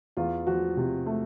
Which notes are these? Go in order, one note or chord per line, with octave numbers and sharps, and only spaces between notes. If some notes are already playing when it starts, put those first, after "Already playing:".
E2 F4
F3 F#4
C3
A3